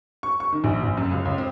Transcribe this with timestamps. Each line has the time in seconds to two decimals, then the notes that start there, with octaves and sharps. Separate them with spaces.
0.23 C#6
0.40 C#6
0.52 D#3
0.64 A#1
0.83 A#1
0.97 F#2
1.11 C#2
1.25 C#2
1.38 C4